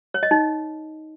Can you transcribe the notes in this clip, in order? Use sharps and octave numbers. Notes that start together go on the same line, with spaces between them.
C#5
D#5
D#4